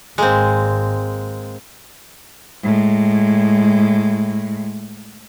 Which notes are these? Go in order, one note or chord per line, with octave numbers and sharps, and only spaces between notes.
G#1 G#3 A#3 C4
A2 G#3